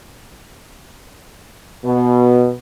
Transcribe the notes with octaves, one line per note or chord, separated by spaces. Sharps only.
B2